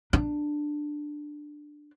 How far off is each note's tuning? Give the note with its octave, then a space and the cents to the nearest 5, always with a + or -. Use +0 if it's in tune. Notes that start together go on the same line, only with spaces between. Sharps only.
D4 +10